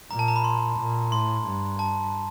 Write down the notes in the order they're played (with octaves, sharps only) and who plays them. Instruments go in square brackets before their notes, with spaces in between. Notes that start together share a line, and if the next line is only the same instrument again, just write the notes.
[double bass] A#2 [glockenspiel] A#5
[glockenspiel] A5
A#5
B5
C6
[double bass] A#2
[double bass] A2 [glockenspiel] C6
[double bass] G2
[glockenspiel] A5